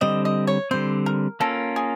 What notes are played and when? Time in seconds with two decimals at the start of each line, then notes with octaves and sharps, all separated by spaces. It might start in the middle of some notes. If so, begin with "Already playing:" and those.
0.01 D3 G3 C4 D#5
0.25 D#5
0.47 C#5
0.71 D3 G3 C4 C5
1.06 A#4
1.40 A#3 C#4 F4 A4 A#4
1.76 G#4